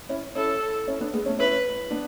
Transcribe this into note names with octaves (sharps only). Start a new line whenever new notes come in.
C#4 E4
C#4 E4 A4
C#4 E4
B3 D4
G#3 B3
A3 C#4
C#4 E4 B4
B3 D4